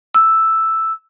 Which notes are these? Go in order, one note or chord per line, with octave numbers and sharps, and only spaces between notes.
E6